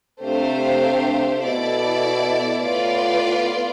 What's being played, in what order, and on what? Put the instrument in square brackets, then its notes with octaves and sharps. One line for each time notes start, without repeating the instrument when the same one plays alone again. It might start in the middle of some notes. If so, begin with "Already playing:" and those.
[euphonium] C3 [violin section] A3 D4 G4 C5 F5
[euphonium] B2 [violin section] E4 A4 D5
[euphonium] A2 [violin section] B3 F4 B4 D5 F5